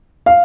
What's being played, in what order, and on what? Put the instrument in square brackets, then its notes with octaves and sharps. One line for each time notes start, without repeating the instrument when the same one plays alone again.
[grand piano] F5